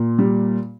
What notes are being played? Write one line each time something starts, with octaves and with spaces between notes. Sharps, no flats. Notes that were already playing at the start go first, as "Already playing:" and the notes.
Already playing: A#2
G3